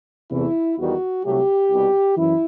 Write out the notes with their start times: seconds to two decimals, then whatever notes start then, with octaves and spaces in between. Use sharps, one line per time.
0.30 E2 C3 E3 A3 E4
0.77 E2 D#3 G3 F#4
1.24 C2 C3 F#3 A3 G4
1.70 C2 B2 G3
2.17 F#2 E3 E4